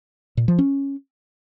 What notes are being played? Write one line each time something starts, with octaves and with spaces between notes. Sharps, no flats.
A#2
F3
C#4